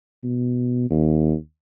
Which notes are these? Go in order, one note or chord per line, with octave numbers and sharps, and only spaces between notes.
B2
D#2